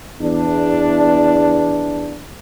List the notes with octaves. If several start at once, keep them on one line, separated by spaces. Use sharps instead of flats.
E2 D4